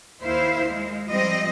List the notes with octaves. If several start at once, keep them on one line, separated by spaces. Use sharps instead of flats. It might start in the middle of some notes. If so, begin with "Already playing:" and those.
D#2 E4 C5 F5
G#3
F3 G3 C4 D#5